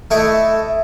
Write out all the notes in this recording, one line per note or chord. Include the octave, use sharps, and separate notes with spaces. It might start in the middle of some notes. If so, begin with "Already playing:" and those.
A3 E4 D#5 C#6 D6